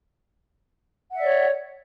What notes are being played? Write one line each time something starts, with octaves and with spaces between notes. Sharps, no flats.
C#5 D5 E5 F#5